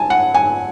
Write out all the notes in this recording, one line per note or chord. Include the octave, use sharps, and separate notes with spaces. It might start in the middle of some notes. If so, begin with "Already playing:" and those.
Already playing: G#5 A5
F#5
G#5